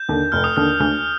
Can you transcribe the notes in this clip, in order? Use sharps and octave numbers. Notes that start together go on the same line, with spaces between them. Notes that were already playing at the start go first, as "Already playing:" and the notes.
Already playing: G6
D#2 D3
F1 F6
D#6
D#2 D3 F6
D2 F6